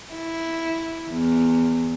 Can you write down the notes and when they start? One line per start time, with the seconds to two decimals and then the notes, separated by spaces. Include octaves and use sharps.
0.13 E4
1.10 E2